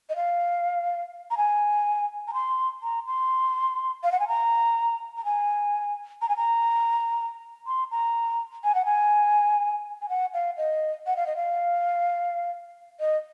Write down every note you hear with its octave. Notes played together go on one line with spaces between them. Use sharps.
D#5
F5
A#5
G#5
A#5
C6
A#5
C6
F5
F#5
G#5
A#5
A#5
G#5
A#5
G#5
A#5
C6
A#5
G#5
F#5
G#5
G#5
F#5
F5
D#5
F#5
F5
D#5
F5
D#5